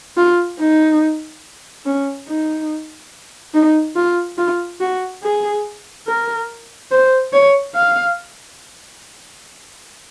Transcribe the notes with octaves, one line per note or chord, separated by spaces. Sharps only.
F4
D#4
C#4
D#4
D#4
F4
F4
F#4
G#4
A#4
C5
C#5
F5